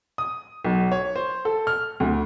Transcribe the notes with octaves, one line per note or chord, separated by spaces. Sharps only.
D#6
B1
C#5
C5
A4
F6
D2